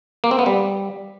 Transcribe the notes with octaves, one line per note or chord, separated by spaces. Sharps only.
A#3
C4
B3
G3